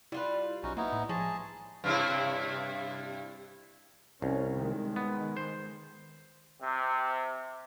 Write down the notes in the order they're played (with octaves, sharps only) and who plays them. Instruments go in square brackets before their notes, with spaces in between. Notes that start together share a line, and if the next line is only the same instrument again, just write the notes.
[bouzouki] G3 F4 B4 [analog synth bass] E4
[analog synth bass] B1 [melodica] C#4 D#4 F#4
[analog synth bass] A#3 [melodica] B3 D#4 E4
[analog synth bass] A2
[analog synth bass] F3 [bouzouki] G#3 C#5 [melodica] G#4 A5
[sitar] G2 C3 E4
[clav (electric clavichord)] C2 [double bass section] C#4
[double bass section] D#3 G#3
[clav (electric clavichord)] B3
C5
[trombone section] C3